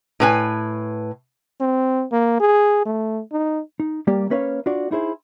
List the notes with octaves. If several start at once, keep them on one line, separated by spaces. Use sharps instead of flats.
A2 B4 G#5
C4
A#3
G#4
A3
D#4
D#4
G3 A#3 G4 D5
A#3 C#4 B4 C#5 D#5 F5
D4 F4 F#4 D5
D#4 E4 G#4 C5